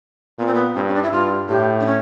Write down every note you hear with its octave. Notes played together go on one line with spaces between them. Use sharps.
A#2 B3
C4
B3
G2 C4
C#4
D4
E4
G2 F4
A2 G4
D4
C#4